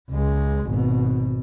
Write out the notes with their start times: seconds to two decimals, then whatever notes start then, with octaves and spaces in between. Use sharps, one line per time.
0.10 C#2 G#3
0.67 G#1 B2